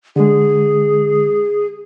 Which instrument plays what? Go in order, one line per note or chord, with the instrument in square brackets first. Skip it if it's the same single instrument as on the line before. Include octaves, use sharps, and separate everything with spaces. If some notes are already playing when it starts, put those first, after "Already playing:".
[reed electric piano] D3 G#3 [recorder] G#4